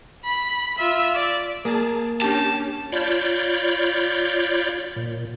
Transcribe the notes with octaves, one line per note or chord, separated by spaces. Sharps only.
B5
F4 E5
D5
A#3 G#4 A5
C#4 D4 G4 A5 A6 A#6
F4 C#5 D5 B5 G6
A#2